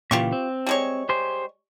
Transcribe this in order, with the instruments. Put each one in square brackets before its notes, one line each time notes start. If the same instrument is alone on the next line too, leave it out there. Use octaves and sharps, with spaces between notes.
[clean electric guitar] A#2 C#3 E3 [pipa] F4 G4 C#6
[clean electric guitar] C4
[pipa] G3 G#3 C#5
[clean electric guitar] G4 G#4 C5